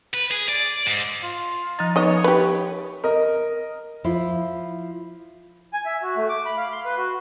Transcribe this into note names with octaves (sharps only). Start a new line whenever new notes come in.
B4
G#4
D5
G#2
F4
F3 D#4 A6
B3 D#4 C#5 D#5
G4 B4
A#4 D#5
F3 E4 F4
G#5
E5
F#4
A3
D6
B5
F5
C6
B4
F#4